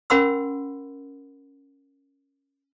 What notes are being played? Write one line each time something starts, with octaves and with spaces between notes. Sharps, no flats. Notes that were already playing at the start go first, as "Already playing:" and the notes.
C#4 A#4 F#5 B5 C6 E6